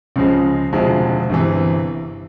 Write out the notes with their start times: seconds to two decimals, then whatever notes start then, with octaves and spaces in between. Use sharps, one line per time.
0.16 C#2 C#3 F3 G#3
0.73 E1 D2 C3 F3 G#3
1.29 G1 C3 E3